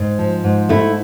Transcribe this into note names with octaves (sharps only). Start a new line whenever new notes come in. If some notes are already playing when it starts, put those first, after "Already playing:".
Already playing: G#2
F3
G#2
A3 E4